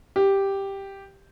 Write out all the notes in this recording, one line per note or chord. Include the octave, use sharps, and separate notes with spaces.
G4